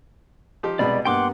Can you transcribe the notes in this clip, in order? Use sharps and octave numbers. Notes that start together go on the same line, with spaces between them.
F3 D#4 G4
C2 B2 G#3 B3 D5 B5
G2 A#3 B3 F#5 G5 C6 D6